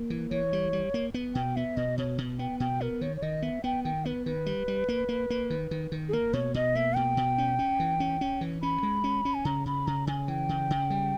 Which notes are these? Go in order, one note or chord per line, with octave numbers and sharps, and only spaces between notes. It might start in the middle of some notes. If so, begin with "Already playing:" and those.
Already playing: A#3
E3
E3 C#5
G3
G3
A#3
B3
B2 G5
B3 E5
B2 D#5
B2 C#5
B2
B3 G5
B2 G5
B3 A#4
D#3 C#5
C#5
D#3 D#5
B3 E5
B3 G5
D#3 G5
B3 B4
D#3 B4
G3
G3
A#3
A#3
A#3
D#3
D#3
D#3
G#4
A#3 A#4
B2 C#5
B2 D#5
A#3 E5
B2 G5
B2
C#4
C#4
E3
C#4
C#4
E3
C#4 B5
G#3
C#4
C#4
G#5
C#3 A#5
C#3 B5
C#3 A#5
C#3 G#5
E3 G5
C#3
C#3
G3